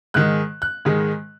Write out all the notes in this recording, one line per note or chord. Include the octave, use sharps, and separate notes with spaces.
G#2 D#3 G#3 F#6
F#6
G#2 D#3 G#3